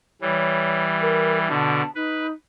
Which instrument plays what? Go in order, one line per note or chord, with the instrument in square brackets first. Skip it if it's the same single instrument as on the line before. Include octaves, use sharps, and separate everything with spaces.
[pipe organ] E3 G3 [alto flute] C#5
[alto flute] A#4
[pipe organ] B2 D3 [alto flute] A5
[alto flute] D#4 [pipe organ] B4